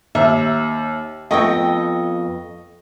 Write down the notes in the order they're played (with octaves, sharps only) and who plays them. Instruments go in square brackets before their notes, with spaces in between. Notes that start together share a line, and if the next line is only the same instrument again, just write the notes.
[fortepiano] D#2 [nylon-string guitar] E5
[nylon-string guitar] F2 B3 G5 [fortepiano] D#5 C#6